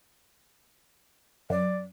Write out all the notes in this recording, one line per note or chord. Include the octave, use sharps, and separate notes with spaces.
F#2 D5